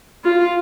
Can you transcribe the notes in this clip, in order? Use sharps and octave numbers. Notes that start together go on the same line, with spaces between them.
F4